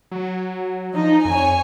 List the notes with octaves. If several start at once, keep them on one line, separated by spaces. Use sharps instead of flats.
F#3
F3 D#4
F2 C#5 G#5